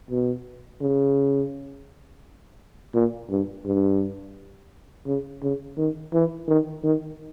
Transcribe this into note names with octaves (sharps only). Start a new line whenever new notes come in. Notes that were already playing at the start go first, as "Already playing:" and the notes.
B2
C#3
A#2
G2
G2
C#3
C#3
D#3
E3
D#3
D#3